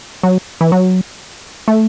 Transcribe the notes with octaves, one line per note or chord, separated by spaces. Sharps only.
F#3
E3
F#3
A3